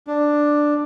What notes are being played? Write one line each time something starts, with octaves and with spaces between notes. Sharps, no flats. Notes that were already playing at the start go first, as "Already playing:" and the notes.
D4